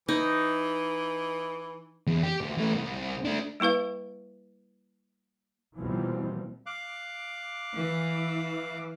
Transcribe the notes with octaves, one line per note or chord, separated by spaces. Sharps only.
E3 D#4
E2
G4
D2
E3 A3
C2
A3 D4
G3 A#3 E4 B4 F5
D#2 B2 E3 F3 G3 C4
F5 D6 F#6
E3